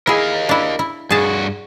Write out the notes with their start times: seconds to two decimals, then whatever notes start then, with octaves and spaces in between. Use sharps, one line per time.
0.07 E4 G#4 A#4 D#5 F5
0.49 D4 E4
0.79 E4
1.10 G2 F#4 G#4 A5